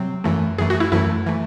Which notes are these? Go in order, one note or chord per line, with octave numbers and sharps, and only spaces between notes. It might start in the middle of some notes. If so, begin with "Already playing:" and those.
Already playing: C3 F#3 C4
F#2 E3 A3
F#2 E3 A3 G#4
F#4
E4
F#2 E3 A3 E4
E3 A3